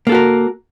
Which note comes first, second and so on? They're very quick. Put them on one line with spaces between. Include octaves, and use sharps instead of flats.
A#3 A4 F#4 A#4